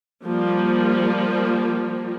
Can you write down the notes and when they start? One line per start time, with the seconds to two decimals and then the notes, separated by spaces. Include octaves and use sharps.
0.25 F3 G3 A#3